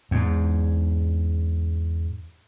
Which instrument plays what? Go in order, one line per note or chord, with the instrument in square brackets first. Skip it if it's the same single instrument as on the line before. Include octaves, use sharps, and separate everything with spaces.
[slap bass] E2 G#2